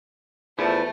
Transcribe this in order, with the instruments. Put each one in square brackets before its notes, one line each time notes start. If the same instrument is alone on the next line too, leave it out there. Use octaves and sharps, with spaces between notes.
[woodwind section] E2 [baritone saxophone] F3 [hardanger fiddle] A3 [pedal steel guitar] E4